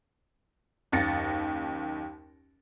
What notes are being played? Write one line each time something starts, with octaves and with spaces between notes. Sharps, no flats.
F#1 D#2 A6 A#6 C#7